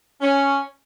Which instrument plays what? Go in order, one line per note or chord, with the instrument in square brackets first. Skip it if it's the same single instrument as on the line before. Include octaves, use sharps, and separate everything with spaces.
[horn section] C#4